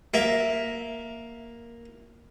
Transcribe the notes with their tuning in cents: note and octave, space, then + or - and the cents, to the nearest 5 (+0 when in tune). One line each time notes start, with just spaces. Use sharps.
A#3 +5 E5 +0